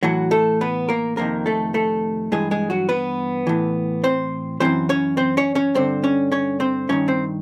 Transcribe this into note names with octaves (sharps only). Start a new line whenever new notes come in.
A2 E3 F#3 F#4
A3 A4
B3 B4
A#3 A#4
F2 C3 D#3 A#3 A#4
A3 A4
A3 A4
G2 E3 G#3 G#4
G#3 G#4
F#3 F#4
B3 B4
A2 E3
C4 C5
F#2 C#3 E3 C4 C5
C#4 C#5
C4 C5
C#4 C#5
C#4 C#5
G2 D3 C4 C5
C#4 C#5
C#4 C#5
C4 C5
G2 D#3 C#4 C#5
C4 C5